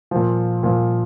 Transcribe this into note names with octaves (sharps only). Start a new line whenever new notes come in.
A#2 F3
A#2 F3